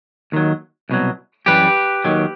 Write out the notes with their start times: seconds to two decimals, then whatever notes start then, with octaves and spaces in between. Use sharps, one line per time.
0.32 D#2 D#3 F#3
0.89 C2 B2 F#3
1.46 F#2 E3 G3 G4 B4
2.05 D#2 D#3 F#3